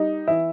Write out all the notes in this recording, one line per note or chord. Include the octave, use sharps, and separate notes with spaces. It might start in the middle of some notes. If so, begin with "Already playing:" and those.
Already playing: G3 D#4
E3 E4